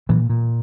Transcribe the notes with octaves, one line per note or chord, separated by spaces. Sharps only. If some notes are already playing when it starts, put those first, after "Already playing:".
A#2 E3 F#3
A#2